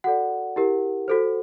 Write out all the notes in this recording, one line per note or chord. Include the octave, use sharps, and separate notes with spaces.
F#4 A4 D5 F#5
E4 G4 A#4
F#4 A4 C5